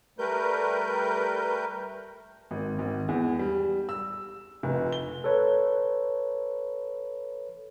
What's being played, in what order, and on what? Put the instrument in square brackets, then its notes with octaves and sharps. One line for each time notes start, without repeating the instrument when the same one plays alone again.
[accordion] G3 A3 A#4 B4 G6
[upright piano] G#1
G#1
E2
G3
E6
F1
G7
[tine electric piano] A4 B4 C#5